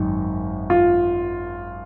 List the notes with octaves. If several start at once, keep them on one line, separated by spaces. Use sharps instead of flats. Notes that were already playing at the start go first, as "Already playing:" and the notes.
Already playing: G#1 F#2 D#3
F4